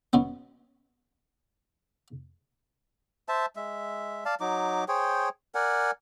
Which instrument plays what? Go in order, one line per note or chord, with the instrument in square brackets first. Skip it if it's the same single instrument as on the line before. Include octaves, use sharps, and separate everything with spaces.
[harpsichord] B2 F#3 B3 C#4
[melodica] C5 E5 A5
G#3 E5
D5 F5 A5
F#3 D#4 D6
G#4 C5 C#5 G5
A#4 D5 F#5 G#5